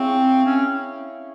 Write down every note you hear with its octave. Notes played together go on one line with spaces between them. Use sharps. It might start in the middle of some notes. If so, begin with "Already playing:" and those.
Already playing: C4 E4 G#4 C#5 F5
C#4